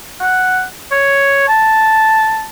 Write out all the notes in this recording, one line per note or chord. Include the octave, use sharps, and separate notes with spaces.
F#5
C#5
A5